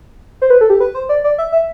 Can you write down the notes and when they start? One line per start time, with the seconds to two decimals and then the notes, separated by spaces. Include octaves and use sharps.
0.42 C5
0.50 B4
0.61 A4
0.70 G4
0.80 B4
0.95 C5
1.09 D5
1.24 D5
1.38 E5
1.52 E5